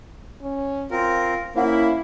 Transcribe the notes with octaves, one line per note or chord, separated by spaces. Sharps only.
C#4
C4 F4 A#4
A#3 C#4 E4 C5 F5 F#5